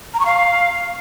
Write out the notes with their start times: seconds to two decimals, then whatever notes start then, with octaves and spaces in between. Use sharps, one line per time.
0.14 A#5
0.20 C#6
0.26 F5